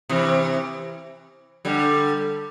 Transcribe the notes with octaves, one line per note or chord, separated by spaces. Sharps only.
C3 E3
D3 G3